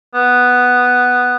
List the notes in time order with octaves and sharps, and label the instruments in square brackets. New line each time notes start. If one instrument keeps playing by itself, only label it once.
[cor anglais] B3